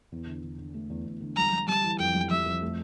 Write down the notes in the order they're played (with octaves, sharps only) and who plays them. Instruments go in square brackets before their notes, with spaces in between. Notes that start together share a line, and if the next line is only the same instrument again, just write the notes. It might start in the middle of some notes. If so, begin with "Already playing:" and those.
[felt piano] E2
D3
D3
D3
A3
E2
E2
D3
[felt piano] G3 [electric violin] A#5
[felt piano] G3
[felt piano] G3 [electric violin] A5
[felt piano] E3
[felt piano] F2 [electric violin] G5
[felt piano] G3
[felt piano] G3 [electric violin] E5
[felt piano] F2
A3